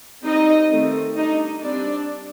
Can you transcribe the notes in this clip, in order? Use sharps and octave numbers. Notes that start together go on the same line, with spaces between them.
G3 C4 D#4 D#5
D#3 A3 C4
G3 D4 D#4 D#5
G3 C4 D4 D5